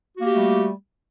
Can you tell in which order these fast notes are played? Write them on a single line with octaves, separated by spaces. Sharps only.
F#4 A#3 G4 A3 G3